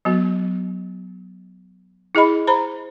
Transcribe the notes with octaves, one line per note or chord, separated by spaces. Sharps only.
F#3 B3 F#4
E4 G#4 D#5 B5
C5 A#5 B5